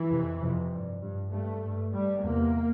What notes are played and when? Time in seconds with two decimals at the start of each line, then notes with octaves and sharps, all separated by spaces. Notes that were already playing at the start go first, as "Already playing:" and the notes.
Already playing: E3
0.10 F2 C3
0.41 F2 C3
0.72 G2
1.02 G2
1.32 G2 A3
1.63 G2
1.92 G2 G3
2.24 E2 C3 A#3